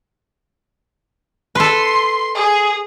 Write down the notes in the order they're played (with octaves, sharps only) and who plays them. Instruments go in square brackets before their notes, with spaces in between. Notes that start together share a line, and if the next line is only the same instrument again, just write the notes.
[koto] A4 B4 [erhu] C6
[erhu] G#4